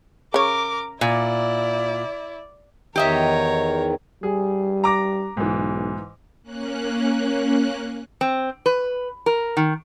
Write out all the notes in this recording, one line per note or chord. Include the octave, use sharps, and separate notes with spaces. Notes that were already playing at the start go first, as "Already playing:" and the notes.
C#3 A#4 C#5 D6
A#2 E4 D5
E2 D#3 G4 C#5 D#5 E5 A#5
G3 G#4
A#5 D6 A#6
B1 G#2 E3
A#3 C#4 F#6
C4
B4
A#4
D#3